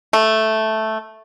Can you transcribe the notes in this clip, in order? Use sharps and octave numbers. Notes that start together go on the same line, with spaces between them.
A3